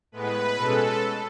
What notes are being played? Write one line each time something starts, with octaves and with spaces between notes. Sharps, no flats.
A2 G#3 B3 B4
B2 G#3 C#4 A4